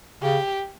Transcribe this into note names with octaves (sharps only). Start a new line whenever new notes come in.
C#3 G4